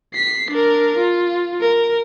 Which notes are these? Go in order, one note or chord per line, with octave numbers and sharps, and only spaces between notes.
B6 C7
D4 A#4
F4
A#4